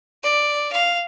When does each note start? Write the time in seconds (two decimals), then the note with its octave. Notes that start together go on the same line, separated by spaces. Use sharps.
0.23 D5
0.72 F5